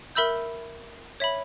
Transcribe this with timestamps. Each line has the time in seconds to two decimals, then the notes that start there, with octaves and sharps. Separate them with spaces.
0.15 A#4 E5 B5 E6 G6
1.20 C#5 E5 B5